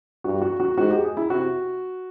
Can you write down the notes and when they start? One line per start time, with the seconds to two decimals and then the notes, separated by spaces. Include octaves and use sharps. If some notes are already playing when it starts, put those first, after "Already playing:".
0.24 G2 F#4
0.42 F#4
0.60 F#4
0.78 G#2 F#4
0.90 G4
1.04 G#4
1.17 E4
1.30 C3 F#4